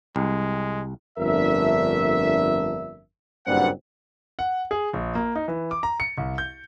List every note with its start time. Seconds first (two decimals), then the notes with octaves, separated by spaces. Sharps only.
0.16 C2 G#3
1.18 G1 F2 A3 D4 A#4 E5
3.46 F#1 G2 A#2 G3 C4 F#5
4.39 F#5
4.71 G#4
4.93 A#1
5.15 A#3
5.35 D#4
5.48 E3
5.71 D6
5.83 A#5
6.00 C#7
6.18 C2
6.38 G6